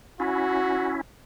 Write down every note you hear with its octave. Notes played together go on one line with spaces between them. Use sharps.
C#4 E4 F#4